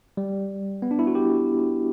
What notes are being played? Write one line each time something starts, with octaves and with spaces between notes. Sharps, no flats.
G3
B3
D4
E4
F#4
G4